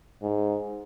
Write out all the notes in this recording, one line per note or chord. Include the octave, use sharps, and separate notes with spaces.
G#2